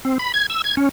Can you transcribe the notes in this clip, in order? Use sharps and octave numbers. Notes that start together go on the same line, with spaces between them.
C4
B5
G#6
E6
G#6
C#4